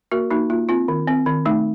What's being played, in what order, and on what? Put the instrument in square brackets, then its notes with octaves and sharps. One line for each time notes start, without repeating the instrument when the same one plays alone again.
[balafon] A#3 F#4 A#4
A#3 D#4 F#4
A#3 F4
C4 F4
D#3
C4
D#3
A3 D#4